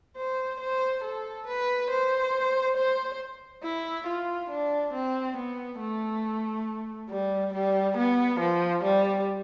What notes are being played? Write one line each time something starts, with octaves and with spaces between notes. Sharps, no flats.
C5
C5
A4
B4
C5
C5
E4
F4
D4
C4
B3
A3
G3
G3
B3
F3
G3